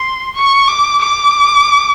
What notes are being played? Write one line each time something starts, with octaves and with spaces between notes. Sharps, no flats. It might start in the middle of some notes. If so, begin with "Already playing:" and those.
Already playing: C6
C#6
D6
D6